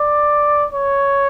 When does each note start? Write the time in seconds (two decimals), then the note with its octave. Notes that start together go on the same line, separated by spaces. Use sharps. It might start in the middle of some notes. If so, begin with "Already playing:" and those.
Already playing: D5
0.73 C#5